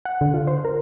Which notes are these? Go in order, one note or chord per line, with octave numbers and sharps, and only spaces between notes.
F#5
D3
F4
C5
A#4